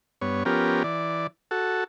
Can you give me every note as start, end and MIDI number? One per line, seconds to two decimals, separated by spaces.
0.21 0.43 43
0.21 0.43 59
0.21 0.43 73
0.45 0.83 53
0.45 0.83 59
0.45 0.83 61
0.45 0.83 67
0.45 0.83 70
0.84 1.27 52
0.84 1.27 74
1.51 1.84 66
1.51 1.84 69